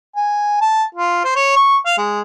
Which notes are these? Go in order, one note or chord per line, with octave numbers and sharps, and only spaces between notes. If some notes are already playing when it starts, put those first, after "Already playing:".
G#5
A5
F4
C5
C#5
C#6
F5
G#3